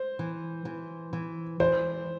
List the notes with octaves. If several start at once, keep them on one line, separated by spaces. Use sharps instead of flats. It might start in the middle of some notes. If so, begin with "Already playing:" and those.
Already playing: C5
E3
E3
E3
E3 C5